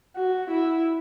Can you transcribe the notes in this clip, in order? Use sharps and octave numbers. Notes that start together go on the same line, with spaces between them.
F#4
E4